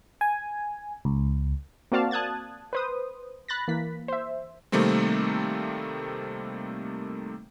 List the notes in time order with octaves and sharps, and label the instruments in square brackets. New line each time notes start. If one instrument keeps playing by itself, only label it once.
[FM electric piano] G#5
C#2
[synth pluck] A#3 C4 F#4 D5 F5 A5
A5 D#6 F#6 G#6 A6
B4 C5 D#6
B5 F#6 A6 A#6
E3 A#3 B6
C5 E5
[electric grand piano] C3 D#3 G3 A3 A#3 C4